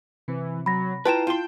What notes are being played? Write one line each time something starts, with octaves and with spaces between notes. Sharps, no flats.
C3 E3
F#3 B5 A#6
E4 F4 B4 G5 A5 A#5 E7
F4 G5 C6